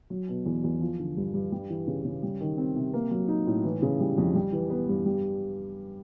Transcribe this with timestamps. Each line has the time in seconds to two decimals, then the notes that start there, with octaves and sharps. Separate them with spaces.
0.10 F#3
0.28 B2
0.46 E2
0.64 E2
0.81 F3
0.99 D3
1.17 G2
1.34 G2
1.52 G3
1.70 E3
1.87 C#3
2.04 C#3
2.23 G3
2.40 D#3
2.57 C4
2.76 C3
2.94 A#3
3.11 F#3
3.28 D#4
3.47 A2
3.64 E3
3.82 C#3
4.00 G3
4.18 F2
4.35 G3
4.52 E3
4.70 B3
4.88 G2
5.06 G3